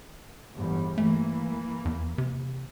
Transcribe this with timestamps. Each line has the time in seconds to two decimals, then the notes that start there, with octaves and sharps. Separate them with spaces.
0.56 G1 E2 G2
0.98 E3 A3 A#3
1.85 E2
2.18 C3